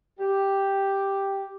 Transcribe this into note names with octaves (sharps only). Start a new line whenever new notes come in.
G4